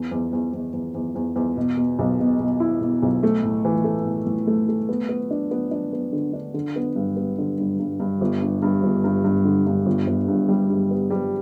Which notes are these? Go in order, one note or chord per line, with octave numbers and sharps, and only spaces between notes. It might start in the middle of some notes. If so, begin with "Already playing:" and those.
Already playing: E2
E2
E2
E2
E2
E2
E2
E2
B2
B2
B1
B2
B2
E4
B2
B1
A3
A2
E3
A3
A2
A2
A3
A3
B3
B3
D4
B3
D4
B3
D3
D4
D3
B3
G2
B3
D3
G2
G2
G2
G1
G2
G2
G1
G2
G2
D3
G2
G1
G1
G2
G3
G2
B3
G3